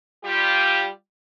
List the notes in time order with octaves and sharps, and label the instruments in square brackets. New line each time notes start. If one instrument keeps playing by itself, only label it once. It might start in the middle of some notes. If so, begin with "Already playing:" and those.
[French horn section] G3 F4 G4